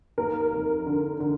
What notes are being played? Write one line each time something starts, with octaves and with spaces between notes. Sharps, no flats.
D#2 A#4
F1
D3
D3